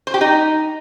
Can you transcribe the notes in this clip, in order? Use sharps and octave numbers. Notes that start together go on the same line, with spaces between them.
C5
G4
D#4